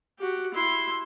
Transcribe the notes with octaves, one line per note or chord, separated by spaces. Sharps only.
F#4 G4
E4 C6